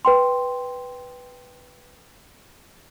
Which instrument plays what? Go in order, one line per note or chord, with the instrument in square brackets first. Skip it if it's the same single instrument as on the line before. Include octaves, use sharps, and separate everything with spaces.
[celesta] B4 G5 C6